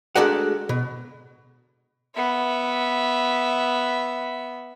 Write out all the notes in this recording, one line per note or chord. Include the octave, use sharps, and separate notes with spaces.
G#3 A3 D4 F#4 A#4 F#5
B2
B3 E5